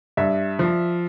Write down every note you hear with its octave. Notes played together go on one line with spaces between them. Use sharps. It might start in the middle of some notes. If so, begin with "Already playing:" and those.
G2 E5
F3